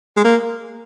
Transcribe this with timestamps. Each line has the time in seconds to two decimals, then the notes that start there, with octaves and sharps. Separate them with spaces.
0.17 G#3
0.25 A#3